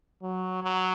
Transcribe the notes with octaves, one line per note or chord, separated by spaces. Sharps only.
F#3
F#3